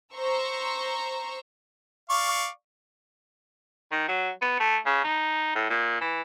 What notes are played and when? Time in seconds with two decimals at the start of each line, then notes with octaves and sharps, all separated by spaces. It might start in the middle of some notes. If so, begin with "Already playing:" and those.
0.15 C5 A#5 C#6 E6
2.10 D5 F5 C#6
3.92 D#3
4.08 F#3
4.42 B3
4.60 A3
4.86 C#3
5.04 D#4
5.55 A2
5.70 A#2
6.01 E3